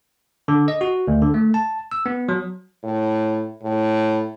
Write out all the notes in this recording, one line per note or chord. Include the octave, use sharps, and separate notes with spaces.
D3
D#5
F#4
D2
D3
A3
A5
E6
B3
F#3
A2
A2